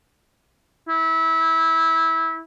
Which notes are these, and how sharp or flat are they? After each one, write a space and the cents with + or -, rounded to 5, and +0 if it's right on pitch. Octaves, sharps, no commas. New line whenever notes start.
E4 -20